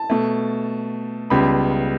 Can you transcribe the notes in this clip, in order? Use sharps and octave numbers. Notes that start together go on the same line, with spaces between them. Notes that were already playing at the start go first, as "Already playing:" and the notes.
Already playing: A5
B2 A3
C#2 C#3 G3 B3 B5